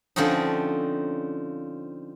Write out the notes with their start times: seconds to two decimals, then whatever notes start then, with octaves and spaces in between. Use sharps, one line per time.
0.16 D3 F3 C4 C#4 D#4